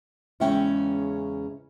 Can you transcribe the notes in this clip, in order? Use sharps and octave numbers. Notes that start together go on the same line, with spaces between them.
E2 C#3 G#3 C#4 E5 G5